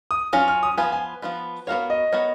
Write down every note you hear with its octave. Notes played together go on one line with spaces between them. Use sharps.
D#6
F#3 C#4 F4 F6
F6
D#6
F3 B3 F4 B4 G#5
G#5
F3 B3 F4 B4
B3 F#4 A#4 C#5 F5
D#5
B3 F#4 A#4 C#5